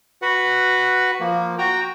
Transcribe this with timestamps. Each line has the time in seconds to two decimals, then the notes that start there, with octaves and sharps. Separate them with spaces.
0.22 F#4 B4 F#5
1.20 F3 A#3
1.59 F#4 G5 A#5